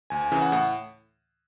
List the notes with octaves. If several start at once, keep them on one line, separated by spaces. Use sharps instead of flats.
D2 G#5
G#5
C#3 E3 G#5
F#5
A2 F#5